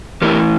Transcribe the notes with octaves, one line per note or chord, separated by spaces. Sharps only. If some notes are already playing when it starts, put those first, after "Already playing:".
E3 A3 E4 G4 A#4